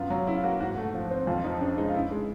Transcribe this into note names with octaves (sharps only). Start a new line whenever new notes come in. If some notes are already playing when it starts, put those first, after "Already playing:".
Already playing: F#2 B3 F4
F#3 F4
C#3 E4
F4
A#3 F#4
G#2 F#4
A3
F3
C4
F2 F4
F3 D#4
C#3 D4
G#3 D#4
F4
C#3 E4
G#3